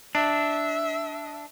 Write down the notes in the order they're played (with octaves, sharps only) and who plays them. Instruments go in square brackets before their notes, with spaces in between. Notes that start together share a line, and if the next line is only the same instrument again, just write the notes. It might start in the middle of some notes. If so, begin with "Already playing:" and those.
[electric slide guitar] D4 [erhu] E5